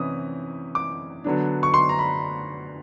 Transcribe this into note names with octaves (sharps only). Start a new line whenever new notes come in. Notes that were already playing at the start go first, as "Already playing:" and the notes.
Already playing: C3 E3 C#4 D#6
D6
D3 F#3 B3 D4
C#6
C6
A#5
B5